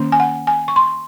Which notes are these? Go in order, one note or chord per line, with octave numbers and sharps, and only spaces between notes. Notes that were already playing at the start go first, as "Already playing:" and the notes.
Already playing: D#3 A#3 C#4
G#5
F#5
G#5
C#6
C6